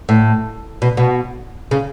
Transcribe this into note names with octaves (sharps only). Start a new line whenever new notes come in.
A2
B2
B2
C#3